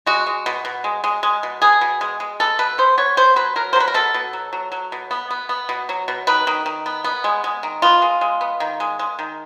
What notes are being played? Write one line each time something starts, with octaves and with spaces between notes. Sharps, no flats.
G#3 F#4
G#3
B2
B2
G#3
G#3
G#3
B2
B3 G#4
B2
G#3
G#3
B3 A4
B2 B4
B3 C5
B3 C#5
B3 C5
F#3 B4
F#3 A#4
C5
F#3 B4
A#4
B2 A4
B2
F#3
F#3
F#3
B2
B3
B3
B3
B2
F#3
B2
D#3 B4
D#3
D#3
B3
B3
G#3
G#3
D#3
B3 F4
G#3
G#3
B3
D#3
G#3
G#3
D#3